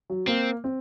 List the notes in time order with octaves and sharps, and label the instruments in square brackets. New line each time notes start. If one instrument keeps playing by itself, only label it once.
[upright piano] F#3
[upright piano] A#3 [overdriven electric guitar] C4
[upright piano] C4